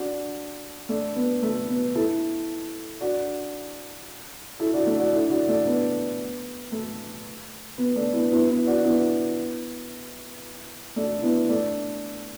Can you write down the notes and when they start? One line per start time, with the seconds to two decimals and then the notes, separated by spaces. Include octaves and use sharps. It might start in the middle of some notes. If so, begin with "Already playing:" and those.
Already playing: D4 F#4
0.89 A3 D4
1.16 B3
1.43 A3
1.69 B3
1.95 E4 A4
3.01 D4 F#4
4.59 E4 A4
4.73 D4 F#4
4.86 A3 D4
5.00 D4 F#4
5.13 E4 A4
5.30 D4 F#4
5.48 A3 D4
5.67 B3
6.72 A3
7.78 B3
7.96 A3 D4
8.13 B3 E4
8.32 B3 E4
8.49 B3 E4
8.66 D4 F#4
8.84 B3 E4
10.96 A3 D4
11.22 B3 E4
11.49 A3 D4